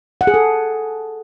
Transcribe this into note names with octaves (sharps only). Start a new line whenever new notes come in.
F#5
G#4
A4